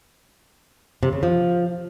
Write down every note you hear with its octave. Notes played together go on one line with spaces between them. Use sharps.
C3
C#3
F3